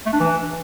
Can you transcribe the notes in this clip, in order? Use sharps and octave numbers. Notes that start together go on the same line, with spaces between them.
A3
D4
E3